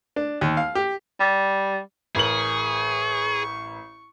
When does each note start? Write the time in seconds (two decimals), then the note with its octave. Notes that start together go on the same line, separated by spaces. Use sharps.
0.16 D4
0.41 D#2
0.57 F5
0.75 G4
1.20 G3
2.15 A1 G#4 A#4 C#6 F#7